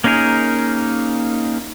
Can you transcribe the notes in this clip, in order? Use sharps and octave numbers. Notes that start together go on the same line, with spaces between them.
A#3 C#4 D#4 G#4 A#4